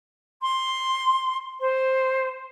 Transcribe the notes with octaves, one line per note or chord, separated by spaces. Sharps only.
C6
C5